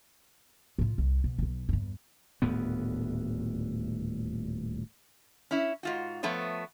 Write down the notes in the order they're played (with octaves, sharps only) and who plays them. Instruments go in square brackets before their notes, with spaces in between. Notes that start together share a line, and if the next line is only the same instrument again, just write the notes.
[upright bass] A2 F4
C2
B2
B1 D#4
E2 G2
[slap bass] D#1 D2 A2 B3
[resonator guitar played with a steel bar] C#4 E4
G#2 F4 F#4
F3 A3 B3 B4 C#5